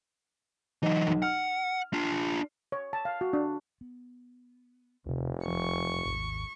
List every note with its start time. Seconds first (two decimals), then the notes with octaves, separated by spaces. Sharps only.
0.83 E3 F#3 D#4
1.08 B1
1.22 F#5 F6
1.94 D4 F4
2.72 C#5
2.93 A5
3.05 F5
3.21 F#4
3.33 D4
3.81 B3
5.06 F1 D#2 C3
5.46 E1 F3 C4 C#6
6.05 G#1 D#2